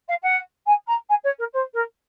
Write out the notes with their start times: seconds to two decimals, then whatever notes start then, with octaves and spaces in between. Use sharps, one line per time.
0.08 F5
0.22 F#5
0.66 G#5
0.87 A#5
1.09 G#5
1.23 C#5
1.38 A#4
1.53 C5
1.73 A#4